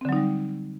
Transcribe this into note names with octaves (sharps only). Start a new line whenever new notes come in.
D3 F#3 G3 C4 D#4